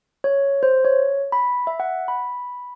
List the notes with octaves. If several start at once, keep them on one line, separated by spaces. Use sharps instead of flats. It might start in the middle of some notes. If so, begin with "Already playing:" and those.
C#5
C5
C#5
B5
E5
F#5
B5